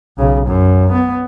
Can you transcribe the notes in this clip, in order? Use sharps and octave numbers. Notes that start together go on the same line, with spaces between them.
B1 C#3
F#2
B3